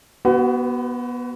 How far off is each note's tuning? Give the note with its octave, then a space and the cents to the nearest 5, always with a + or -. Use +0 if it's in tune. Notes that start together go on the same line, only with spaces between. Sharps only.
B3 -20 F#4 +30 B4 +35